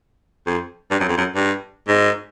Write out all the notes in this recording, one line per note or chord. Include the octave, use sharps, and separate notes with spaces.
F2
G2
F#2
F2
F#2
G2
G#2